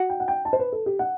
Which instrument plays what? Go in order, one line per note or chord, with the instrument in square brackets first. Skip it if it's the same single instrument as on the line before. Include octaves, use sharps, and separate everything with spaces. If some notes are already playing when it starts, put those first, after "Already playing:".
Already playing: [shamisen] F#4
[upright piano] G5
F#5
G5
A5
C5
B4
A4
G4
F#5